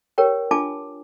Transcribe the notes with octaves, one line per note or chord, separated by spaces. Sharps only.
G4 A#4 C#5 G5
D4 F4 G#5 A5 D6